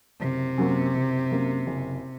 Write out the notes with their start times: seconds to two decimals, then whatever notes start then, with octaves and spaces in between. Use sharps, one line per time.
0.21 F#1 C3
0.58 F#2 F#3 A#3
0.95 F#1
1.31 F#2 F#3 A#3
1.67 F#1